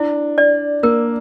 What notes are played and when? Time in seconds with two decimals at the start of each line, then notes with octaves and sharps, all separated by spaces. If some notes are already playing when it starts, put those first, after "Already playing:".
Already playing: D4 E4
0.38 D5
0.83 A#3 A#4